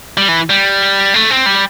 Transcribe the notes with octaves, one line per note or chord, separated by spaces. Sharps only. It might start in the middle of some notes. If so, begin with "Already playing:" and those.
G3
E3
G3
A3
C4
G3